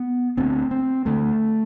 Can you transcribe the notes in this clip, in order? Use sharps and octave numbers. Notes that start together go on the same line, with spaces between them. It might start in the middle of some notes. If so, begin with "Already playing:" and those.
Already playing: B3
D2 D3 C4
C4
D2 D3 A3